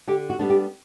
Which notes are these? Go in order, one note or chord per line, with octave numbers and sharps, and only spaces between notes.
D3 G4
F#4
G3 B3 D4
G4